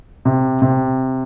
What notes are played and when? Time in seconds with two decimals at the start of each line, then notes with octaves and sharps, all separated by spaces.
0.25 C3
0.62 C3